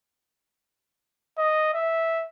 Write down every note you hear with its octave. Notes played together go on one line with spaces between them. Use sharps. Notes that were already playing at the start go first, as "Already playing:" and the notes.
D#5
E5